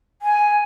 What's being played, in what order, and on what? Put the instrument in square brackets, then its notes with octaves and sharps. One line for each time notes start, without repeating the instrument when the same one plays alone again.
[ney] G#5